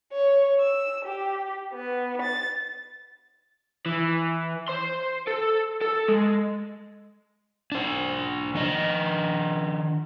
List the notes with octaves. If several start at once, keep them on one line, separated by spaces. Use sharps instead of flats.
C#5
E6
G4
B3
A6
E3
C5 C6
A4
A4
G#3
D4 C5
D#3 D4 D#5